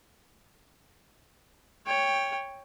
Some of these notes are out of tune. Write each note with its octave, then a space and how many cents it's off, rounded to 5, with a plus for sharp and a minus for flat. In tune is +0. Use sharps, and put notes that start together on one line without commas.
C#5 +0 G5 +15